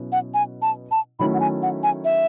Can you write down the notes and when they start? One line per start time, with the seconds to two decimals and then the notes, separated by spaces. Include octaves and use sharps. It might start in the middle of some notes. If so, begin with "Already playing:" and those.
Already playing: B2 F#3 C#4 E4
0.12 F#5
0.34 G#5
0.62 A5
0.91 A5
1.19 D#3 F#3 A3 C#4 E4 B5
1.34 F#5
1.40 G#5
1.62 F#5
1.83 G#5
2.05 E5